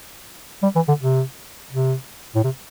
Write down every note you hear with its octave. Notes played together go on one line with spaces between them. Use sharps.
G3
E3
D3
C3
C3
A2
C3